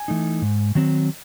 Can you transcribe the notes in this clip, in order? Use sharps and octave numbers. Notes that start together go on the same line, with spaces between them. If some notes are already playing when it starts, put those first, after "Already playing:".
Already playing: G#5
E3 A3 D#4
G#2
D#3 F#3 C4